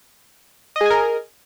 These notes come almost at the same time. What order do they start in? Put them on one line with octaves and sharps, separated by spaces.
D#5 G#4 G#5 A#4